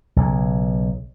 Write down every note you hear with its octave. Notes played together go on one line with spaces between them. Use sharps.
B1 C#3